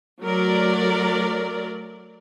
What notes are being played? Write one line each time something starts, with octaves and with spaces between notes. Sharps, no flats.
F#3 A3 A#4 D5